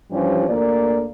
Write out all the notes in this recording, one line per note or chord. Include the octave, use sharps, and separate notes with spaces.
G2 E3 F3 G3 C#4
D2 A#3 D5